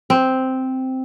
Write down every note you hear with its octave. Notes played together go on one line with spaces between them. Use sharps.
C4